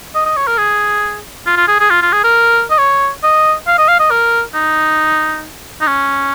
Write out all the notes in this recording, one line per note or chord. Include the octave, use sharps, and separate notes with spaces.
D#5
D#5
C#5
A#4
G#4
F4
F4
G#4
G#4
F4
F4
G#4
A#4
D#5
C#5
D#5
F5
D#5
F5
D#5
A#4
D#4
D#4
C#4